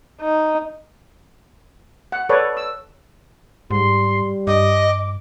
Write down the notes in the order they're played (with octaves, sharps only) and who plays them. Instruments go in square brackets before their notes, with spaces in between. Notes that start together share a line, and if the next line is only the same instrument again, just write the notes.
[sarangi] D#4
[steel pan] F#5
A4 B4 C#5 D5
E6
[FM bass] G#2 [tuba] G3 [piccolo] C6
[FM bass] G2 [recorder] D#5 [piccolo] D6